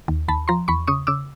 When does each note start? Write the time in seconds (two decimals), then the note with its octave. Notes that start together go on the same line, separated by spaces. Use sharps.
0.08 D#2
0.28 D#2 A5 B5
0.48 F3 A#5 C6
0.68 E2 B5 C#6
0.87 C#3 C#6 D#6
1.07 C#3 D6 E6